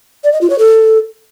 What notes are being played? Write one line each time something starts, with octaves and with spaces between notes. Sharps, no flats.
D5
D#5
F4
C#5
A4